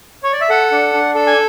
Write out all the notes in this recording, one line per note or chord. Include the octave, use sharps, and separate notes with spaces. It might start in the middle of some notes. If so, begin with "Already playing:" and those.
C#5
D5
E5
A4 F#5
D4
D4
A4
G#5